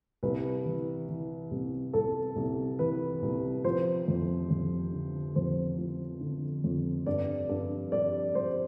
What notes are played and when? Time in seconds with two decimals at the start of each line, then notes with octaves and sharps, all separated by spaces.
0.23 C2 B4
0.65 E3
1.08 E3
1.51 C2
1.93 C2 A4
2.36 C2
2.79 E3 B4
3.22 C2
3.64 F3 C5
4.08 F2
4.50 F2
4.93 D3
5.36 F2 C5
5.78 F3
6.21 D3
6.64 F2
7.06 G2 D5
7.49 G2
7.92 G3 D5
8.35 G3 C5